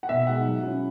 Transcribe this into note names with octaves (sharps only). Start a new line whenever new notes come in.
F#5
B2 E5
G#3 D#4 F#5
F#3
C#4 E4